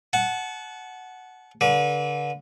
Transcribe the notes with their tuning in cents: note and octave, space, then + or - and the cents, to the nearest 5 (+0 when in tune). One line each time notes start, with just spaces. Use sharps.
F#5 +0 A5 -35
D3 -30 B4 -40